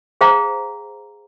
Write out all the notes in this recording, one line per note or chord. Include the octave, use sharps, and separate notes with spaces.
G#4 C5 F5 G5 A#5